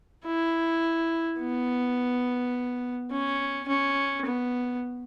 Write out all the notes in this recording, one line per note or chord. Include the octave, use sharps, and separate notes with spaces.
E4
B3
C#4
C#4
B3